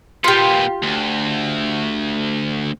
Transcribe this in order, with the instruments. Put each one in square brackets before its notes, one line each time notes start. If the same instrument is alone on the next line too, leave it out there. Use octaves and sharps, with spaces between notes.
[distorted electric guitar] A#2 B3 [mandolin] F4 G4
[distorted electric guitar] D2